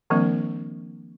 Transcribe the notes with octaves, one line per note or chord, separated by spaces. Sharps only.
D#3 F3 G3 A#3 C4 D4